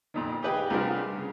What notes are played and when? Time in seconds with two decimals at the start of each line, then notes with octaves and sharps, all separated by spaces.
0.14 F2 A#2 D#3
0.42 D#4 G4 G#4 B4 F5 G5
0.70 C2 C3 D4 F4 G#4 A#4
1.13 C#3